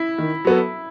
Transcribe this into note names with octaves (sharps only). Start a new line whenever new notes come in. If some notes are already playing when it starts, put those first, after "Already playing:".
Already playing: E4
D#3
F#3 B3 F#4 A4